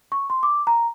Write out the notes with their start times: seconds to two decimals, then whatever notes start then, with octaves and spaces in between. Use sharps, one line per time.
0.12 C#6
0.30 C6
0.43 D6
0.67 A#5